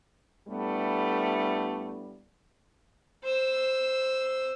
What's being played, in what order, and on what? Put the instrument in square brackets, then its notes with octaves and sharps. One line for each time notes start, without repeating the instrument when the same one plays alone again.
[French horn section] A2 G3 A3 B3 D4
[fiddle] C5 E6